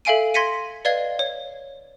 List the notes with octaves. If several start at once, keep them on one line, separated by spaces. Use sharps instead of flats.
A4 E5 F5 G#5 D7 D#7
C6 G#6 A#6 B6 C#7 D#7
B4 D5 D#5 F5 G#6 G7
C#5